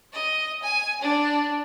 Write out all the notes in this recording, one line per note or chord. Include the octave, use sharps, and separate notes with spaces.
D#5
G#5
D4